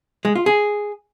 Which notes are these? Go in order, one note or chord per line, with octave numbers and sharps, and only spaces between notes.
G#3
F4
G#4